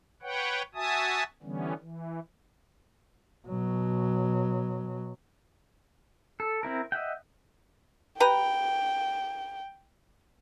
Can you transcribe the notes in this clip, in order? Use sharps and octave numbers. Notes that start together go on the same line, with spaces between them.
B4 C#5 F#5 G5
F#4 E5 G#5 A5 D#6
D3 E3 G3 B3 C#4
E3
B2 F#3
A4
C4 E4 A#4
D#5 E5 F#5 G5
G4 B4 G5 A#5